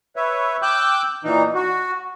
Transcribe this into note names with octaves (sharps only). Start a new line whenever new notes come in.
B4 C#5 E5
G5 D6 E6 F#6 G6
A#2 E3 D#4
F#4